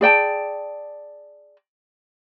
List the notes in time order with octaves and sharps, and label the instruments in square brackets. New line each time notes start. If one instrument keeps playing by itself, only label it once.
[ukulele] G#4 D5 G5 A5